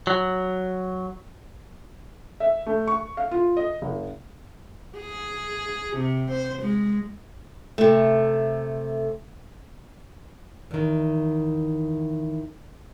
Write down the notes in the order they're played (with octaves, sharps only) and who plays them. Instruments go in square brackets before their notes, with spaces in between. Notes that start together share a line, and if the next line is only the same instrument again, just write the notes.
[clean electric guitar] F#3
[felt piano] E5
A3
C#6
F5
F4
D#5
F#1
[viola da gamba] G#4
C3
C5
G#3
[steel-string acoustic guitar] C3 A3
E2 D#3